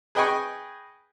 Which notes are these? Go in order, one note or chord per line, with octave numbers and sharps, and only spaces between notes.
G#4 B4 D#5 G5 G#5 C#6